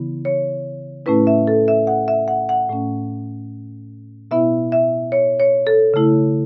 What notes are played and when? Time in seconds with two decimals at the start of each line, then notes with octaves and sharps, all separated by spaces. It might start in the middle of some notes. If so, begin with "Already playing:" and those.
Already playing: C#3 E3 B3 E4
0.25 C#5
1.06 A2 A3 C#4 E4 B4
1.27 E5
1.47 A4
1.68 E5
1.87 F#5
2.08 E5
2.28 F#5
2.49 F#5
2.69 A2 A3 C#4
4.31 B2 B3 E4 E5
4.72 E5
5.12 C#5
5.40 C#5
5.67 A4
5.94 C#3 A3 E4